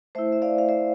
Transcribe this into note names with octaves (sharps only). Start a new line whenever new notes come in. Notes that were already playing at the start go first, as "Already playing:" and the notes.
A3 E4 C5 E5
E5
D5 F5
F5
C5 E5